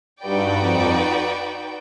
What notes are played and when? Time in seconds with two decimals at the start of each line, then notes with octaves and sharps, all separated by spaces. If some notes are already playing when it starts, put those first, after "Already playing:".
0.23 G2 D#4 F#4 B4 D5 G5
0.61 F2